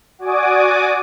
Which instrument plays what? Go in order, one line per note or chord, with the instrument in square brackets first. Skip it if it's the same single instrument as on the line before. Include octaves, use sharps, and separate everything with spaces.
[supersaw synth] F#4 D5 G#5 D6 D#6